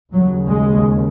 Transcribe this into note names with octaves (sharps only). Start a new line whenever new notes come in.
D#2 C#3 F#3
G#3